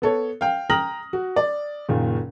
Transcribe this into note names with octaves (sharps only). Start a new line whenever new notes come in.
B3 A4 C#5
F5 G5
G5 A#5 D#6 F6 A#6 F#7
F#4
D5
F#1 A#2 D#3 F4